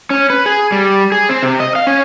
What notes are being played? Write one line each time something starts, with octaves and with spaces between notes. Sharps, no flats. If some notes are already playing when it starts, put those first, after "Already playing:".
C#4
B4
G#4
G3
G#4
C4
C3
D#5
F5
C#4